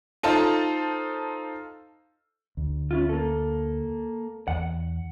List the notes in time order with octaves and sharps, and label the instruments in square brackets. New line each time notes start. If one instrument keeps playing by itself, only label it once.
[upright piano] D#4 F4 A4 C5 A5
[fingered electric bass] D2
[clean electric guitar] C#4 E4 F4
A#3 A4
[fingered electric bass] E2 [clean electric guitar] F#5